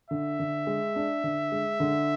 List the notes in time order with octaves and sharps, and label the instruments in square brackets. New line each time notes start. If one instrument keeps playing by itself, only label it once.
[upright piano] D3 [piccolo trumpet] E5
[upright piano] D3
G#3
D4
D3
G#3
D3